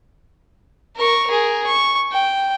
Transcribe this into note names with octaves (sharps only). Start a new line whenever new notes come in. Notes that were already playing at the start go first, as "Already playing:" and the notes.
A#4 C#6
G#4 A#4
C#6
G5